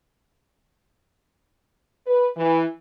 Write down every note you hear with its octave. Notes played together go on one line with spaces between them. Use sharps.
B4
E3